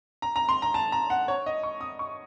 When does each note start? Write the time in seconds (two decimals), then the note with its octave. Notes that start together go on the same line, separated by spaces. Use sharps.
0.22 A#5
0.36 A#5
0.49 C6
0.62 A#5
0.74 A5
0.92 A#5
1.10 F#5
1.28 C#5
1.46 D#5
1.63 C#6
1.81 D#6
1.99 C#6